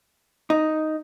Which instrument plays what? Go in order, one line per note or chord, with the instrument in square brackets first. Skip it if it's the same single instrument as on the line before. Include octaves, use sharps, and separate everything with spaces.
[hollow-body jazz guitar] D#4